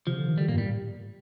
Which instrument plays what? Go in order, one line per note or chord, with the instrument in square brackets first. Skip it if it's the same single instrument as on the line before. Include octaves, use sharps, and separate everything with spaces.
[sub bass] C3 [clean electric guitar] F3
[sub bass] D3
D#3
[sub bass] D3 [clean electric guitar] G3
[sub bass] A#2 [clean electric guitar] A#3
[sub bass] G2
[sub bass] A2 [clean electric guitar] G3